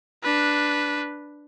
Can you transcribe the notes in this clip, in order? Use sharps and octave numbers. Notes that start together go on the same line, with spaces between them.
D4 B4